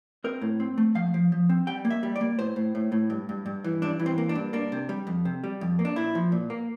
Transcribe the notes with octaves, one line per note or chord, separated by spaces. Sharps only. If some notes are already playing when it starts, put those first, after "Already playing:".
C4 A#4
A2
C4
A3
F3 F5
F3
F3
C4
G3 G5
A#3
E5
G3
D5
A#3
A2 C5
A2
A2
A2
G2
G2
G2
E3
G2 D4
E3
C4
A#3
D4
G2
A#3 D4
C3
G3
F2
C3
G3
F2
A#3
D4
A#2 E4
F3
A#2
A#3